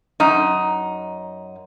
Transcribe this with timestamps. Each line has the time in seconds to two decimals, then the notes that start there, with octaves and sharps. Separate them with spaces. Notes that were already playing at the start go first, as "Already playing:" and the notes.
0.20 F#2 D#4